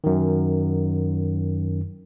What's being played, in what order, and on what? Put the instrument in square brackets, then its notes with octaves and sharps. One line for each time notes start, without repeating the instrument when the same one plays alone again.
[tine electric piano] F#2 D#3